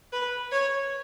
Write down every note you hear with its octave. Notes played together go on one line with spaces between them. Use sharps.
B4
C#5